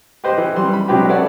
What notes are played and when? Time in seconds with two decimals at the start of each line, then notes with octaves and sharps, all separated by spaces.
0.24 G4 B4 C5 D#5
0.38 E3 G5
0.56 E3 G3 C6
0.73 B5
0.88 C3 F#3 G#3 D4 G4 B4
1.09 A4 B4 C#5 D5 F#5